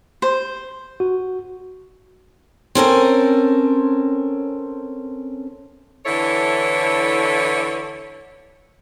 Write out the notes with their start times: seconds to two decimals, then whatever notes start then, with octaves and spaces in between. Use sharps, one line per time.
0.22 C5
1.00 F#4
2.75 C4 C#4 A4 A#4
6.06 D3 E3 E4 A4 C#5